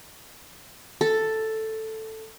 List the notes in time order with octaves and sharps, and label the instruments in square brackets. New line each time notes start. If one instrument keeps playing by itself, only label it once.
[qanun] A4